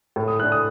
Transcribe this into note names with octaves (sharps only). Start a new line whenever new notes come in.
A2
D#6
A3 D4 F#6
D#6